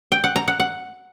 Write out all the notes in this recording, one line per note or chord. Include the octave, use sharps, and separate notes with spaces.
G5
F#5
A#5
F#5
F#5